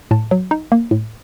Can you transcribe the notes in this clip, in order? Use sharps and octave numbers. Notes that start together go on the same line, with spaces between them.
A2 A5
F#3
D#4
A#3
A2